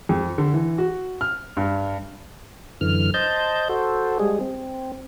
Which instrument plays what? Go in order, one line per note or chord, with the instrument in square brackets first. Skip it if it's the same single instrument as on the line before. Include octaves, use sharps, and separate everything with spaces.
[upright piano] F2
D3
E3
F#4
F6
G2
[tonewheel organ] F#2 D3 E3 F6
C5 D#5 A5 G6
F#4 A4 C5
G3 G#3 G#4
C4